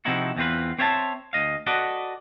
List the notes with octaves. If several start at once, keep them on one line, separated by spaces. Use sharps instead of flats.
C3 F3 C4 D#4 E4 F#4
E2 E3 C4 D#4 F4 B4
C4 C5 C#5 E5 F5 A5
D2 D#5 F5
F#4 A4 B4 D5 D#5